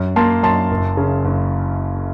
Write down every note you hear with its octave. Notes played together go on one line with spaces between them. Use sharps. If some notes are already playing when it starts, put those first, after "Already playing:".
Already playing: F#2
A#3 A5 C6
F#2 A5 C6
F#1
C#3
F#1